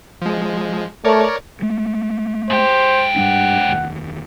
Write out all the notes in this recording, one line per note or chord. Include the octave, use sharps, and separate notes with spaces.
F3 G#3
A3 A#4 C#5 D5
G#3 A3
G#2 G4 C5
G2 G3 D4 F#5
F1 D#2